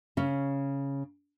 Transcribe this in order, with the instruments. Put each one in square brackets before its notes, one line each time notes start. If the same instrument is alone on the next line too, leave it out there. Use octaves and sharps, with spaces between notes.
[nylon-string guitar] C#3 C#4